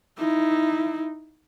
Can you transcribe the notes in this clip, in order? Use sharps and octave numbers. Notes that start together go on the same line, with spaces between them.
D#4 E4